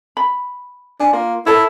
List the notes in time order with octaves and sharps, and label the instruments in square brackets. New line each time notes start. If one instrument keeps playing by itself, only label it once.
[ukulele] B5
[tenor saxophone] D4 [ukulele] G#5
[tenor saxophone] A#3 [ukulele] F4
[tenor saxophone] E4 [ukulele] A4 A#4 C#5